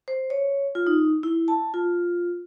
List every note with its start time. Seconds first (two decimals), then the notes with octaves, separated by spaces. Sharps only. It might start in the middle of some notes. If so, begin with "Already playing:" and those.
0.08 C5
0.30 C#5
0.75 F4
0.87 D#4
1.23 E4
1.48 A5
1.74 F4